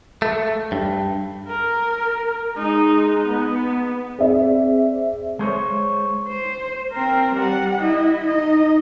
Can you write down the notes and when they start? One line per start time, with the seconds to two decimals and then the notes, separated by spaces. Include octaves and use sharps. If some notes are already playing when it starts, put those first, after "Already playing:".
0.22 A3
0.72 G2
1.48 A#4
2.56 G#3 D#4
3.28 B3
4.19 C4 G#4 D5 E5
5.39 G#3 C5 C#5
6.28 C5
6.92 C4 A#4
7.35 G3 F#5
7.82 E4 D#5
8.27 D#4 D#5